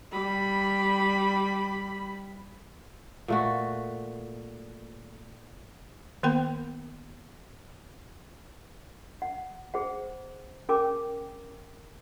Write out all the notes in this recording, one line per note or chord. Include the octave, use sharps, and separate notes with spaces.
G3 B5
A#2 A3 F#4
D#3 A#3 B3 A#4 G5 B5
F#5
G#4 C5 F#5
C#4 G#4 A#4 G5 G#5 D6